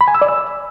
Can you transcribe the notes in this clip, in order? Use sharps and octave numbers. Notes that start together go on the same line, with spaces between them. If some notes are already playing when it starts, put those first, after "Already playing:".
B5
G#5
E6
D5
E6